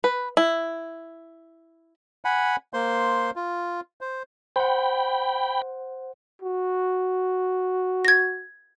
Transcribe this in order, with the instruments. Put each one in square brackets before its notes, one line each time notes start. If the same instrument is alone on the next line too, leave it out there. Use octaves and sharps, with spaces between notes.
[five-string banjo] B4
E4
[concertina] F#5 G#5 B5
A#3 C5 C6
F4
C5
[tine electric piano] C5 F#5 [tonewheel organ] G5 B5
[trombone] F#4
[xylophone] G#6 A#6